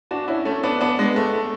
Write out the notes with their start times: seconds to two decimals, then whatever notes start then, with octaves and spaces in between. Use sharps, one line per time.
0.11 D4 F#4
0.28 C#4 E4
0.45 A3 C#4
0.63 B3 D4
0.81 B3 D4
0.99 G#3 B3
1.16 A3
1.33 A3